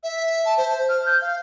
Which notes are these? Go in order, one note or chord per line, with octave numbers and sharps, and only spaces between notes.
E5
A5
C5
F6
G6
F5